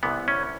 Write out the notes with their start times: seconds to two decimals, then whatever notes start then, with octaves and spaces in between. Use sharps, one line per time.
0.03 C2 C3 E3 B3
0.28 C#4